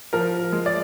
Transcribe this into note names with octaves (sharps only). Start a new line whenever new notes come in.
F3 A#4
G#3
D5